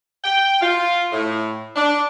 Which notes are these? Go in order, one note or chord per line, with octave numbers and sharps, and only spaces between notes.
G5
F4
A2
D4